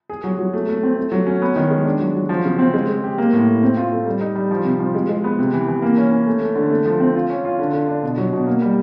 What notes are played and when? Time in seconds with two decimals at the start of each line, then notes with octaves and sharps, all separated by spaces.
0.09 G#4
0.24 F#3
0.38 F#3
0.54 A3
0.69 A3
0.83 C4
0.97 A3
1.12 F#3
1.27 C#4
1.42 B3
1.56 D#3
1.70 G#3
1.85 D4
2.00 F#3
2.15 F#3
2.29 F3
2.45 C#3
2.59 C4
2.74 G#3
2.88 G#3
3.04 G4
3.18 A#3
3.33 A2
3.47 A2
3.63 C4
3.77 F4
3.92 A3
4.07 G3
4.21 D#4
4.35 G3
4.51 F3
4.65 C3
4.80 F3
4.95 G#3
5.09 G#3
5.24 B3
5.39 C3
5.54 E3
5.68 E3
5.82 A#3
5.98 C#4
6.11 C#4
6.26 A3
6.42 A3
6.55 D3
6.70 A3
6.85 F3
7.00 C4
7.14 F4
7.30 C#4
7.45 F4
7.59 D3
7.73 D3
7.88 D4
8.03 B2
8.17 F#3
8.33 B2
8.46 A#3
8.62 G3